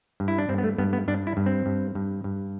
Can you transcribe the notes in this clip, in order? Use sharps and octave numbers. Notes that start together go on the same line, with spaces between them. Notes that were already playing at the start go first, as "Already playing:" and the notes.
G2
E4
D4
G2 C4
B3
A3
G2 B3
B3
G2 D4
E4
G2
C4
G2
G2
G2